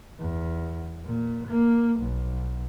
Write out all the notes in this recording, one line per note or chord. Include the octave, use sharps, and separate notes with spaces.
E2
A#2
A#3
B1